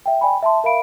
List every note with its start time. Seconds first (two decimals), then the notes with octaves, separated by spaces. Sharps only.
0.06 E5 G5
0.21 D5 G5 G#5 B5
0.42 E5 A5 C6
0.64 A#4 E5 F5 B5 D7